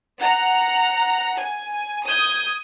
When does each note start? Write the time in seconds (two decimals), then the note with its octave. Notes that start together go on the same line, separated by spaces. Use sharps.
0.21 F#5 A#5
1.39 G#5
2.06 D#6 G6 G#6